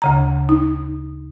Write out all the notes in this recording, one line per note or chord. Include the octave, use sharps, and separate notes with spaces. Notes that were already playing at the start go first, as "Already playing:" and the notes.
D2 C#3 A#5
D#4